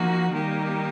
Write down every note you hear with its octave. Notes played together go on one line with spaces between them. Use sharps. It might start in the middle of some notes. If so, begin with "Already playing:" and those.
Already playing: F3 A#3 D#4 F#4
D#3 G3 A#3 D#4 G4